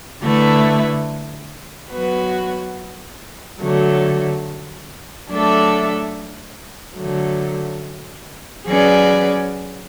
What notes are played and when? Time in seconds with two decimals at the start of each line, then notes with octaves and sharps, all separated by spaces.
0.23 D3 A3 E4 B4
1.92 F#3 B3 F#4 B4
3.61 D3 F#3 A3
5.29 F#3 A3 D4 A4 E5
6.98 D3 F#3 A3
8.67 F#3 C#4 G#4 B4 D5